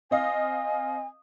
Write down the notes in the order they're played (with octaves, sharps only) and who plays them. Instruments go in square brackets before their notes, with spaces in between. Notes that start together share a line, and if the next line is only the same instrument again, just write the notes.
[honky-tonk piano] C4 D#5 F5 [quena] G#5